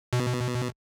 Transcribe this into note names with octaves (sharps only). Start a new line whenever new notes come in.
B2